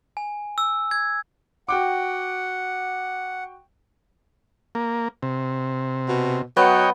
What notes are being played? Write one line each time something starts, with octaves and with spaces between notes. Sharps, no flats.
G#5
E6
G#6
F#4 F#5 G5 D6
A#3
C3
B2
F#3 B3 C#5 D#5 G5